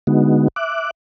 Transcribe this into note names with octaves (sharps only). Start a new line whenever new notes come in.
D3 G#3 B3 D#4 F#4
E5 D6 F#6